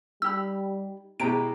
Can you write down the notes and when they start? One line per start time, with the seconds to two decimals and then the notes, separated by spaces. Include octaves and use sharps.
0.22 G3 D#4 G4 B5 E6
1.20 B2 G#3 E4 G4 C5 A#5 D7